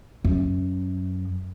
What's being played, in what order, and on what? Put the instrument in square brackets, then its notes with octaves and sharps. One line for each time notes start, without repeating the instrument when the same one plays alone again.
[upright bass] F#2